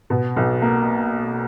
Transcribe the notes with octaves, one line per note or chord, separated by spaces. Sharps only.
B2
B1
A#3